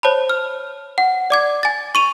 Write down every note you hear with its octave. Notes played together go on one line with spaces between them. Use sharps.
C5 C#5 A5 B5
F6
F#5
D5 D6 G#6
G#5 A6
C#6 D#7 F7